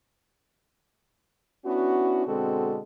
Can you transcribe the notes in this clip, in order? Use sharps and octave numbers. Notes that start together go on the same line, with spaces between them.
B3 C#4 D4 E4 F#4
B2 D3 G#3 C4 F#4 A4